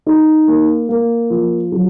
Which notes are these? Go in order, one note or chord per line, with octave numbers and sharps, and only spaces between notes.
D#4
A#3
A#3
F3
F#3